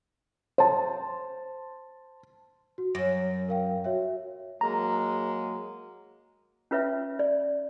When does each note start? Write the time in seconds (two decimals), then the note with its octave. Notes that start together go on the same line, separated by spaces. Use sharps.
0.58 C5 A5
2.78 F#4
2.95 F#2 A#6
3.49 A#4 F5 G5
3.84 F#4 C#5 E5
4.61 F#3 G#3 A#3 A#5
6.71 C#4 F4 B4 C#5 E5
7.19 D5